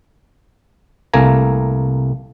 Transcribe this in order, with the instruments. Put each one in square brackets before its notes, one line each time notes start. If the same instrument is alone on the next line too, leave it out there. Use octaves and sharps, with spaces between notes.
[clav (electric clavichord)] C2 A3 A#3 G#5 A#5